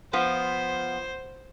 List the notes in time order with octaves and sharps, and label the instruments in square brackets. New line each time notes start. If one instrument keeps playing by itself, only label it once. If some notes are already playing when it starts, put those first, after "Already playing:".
[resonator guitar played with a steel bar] F3 B3 F4 [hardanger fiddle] C5